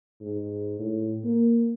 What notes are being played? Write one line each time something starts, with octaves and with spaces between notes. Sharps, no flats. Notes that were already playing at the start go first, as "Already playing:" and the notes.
G#2
A2
A#3